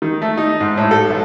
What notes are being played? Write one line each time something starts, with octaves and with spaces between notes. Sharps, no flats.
D#3
A3
D#4
G#2
A2
A4
B1